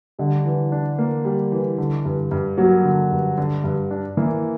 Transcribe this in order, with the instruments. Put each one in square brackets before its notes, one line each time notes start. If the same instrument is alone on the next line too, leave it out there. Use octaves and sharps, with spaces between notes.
[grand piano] D3 [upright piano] G3
[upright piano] E3
D4
A#3
G3
E3
D3
G2
G2
[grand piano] F#3 [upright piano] A#3
[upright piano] D3
G2
D3
G2
D4
[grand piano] E3 [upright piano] A#3